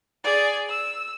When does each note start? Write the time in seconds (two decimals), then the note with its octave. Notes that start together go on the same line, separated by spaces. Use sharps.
0.24 G#4 D5
0.70 E6